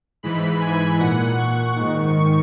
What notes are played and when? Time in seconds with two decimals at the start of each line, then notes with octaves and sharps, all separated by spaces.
0.23 G#2 E3 B5
0.61 G#5
0.99 A#2 F#5
1.37 C#6
1.76 G#2 D#3